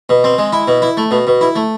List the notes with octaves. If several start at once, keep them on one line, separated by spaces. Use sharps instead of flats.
B2
C4
G#3
E4
B2
E4
A3
B2
B2
E4
A3